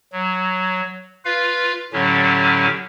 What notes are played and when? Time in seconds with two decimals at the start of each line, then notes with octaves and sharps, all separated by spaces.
0.12 F#3
1.25 F4 B4 F5
1.93 A2 D3 F#3 C#4 G4